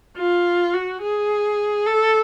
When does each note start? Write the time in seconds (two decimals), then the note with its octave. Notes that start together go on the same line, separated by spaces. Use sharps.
0.17 F4
0.73 F#4
1.02 G#4
1.86 A4